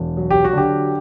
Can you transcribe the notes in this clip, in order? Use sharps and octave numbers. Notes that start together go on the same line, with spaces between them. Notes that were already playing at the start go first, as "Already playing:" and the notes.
Already playing: E1
F#3
G4
F#4
D3 G4